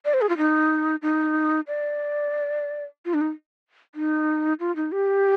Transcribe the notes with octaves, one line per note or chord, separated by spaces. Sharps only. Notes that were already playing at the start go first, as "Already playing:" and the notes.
D5
C5
G#4
F4
D#4
D#4
D5
F4
D4
D#4
D#4
F4
D#4
G4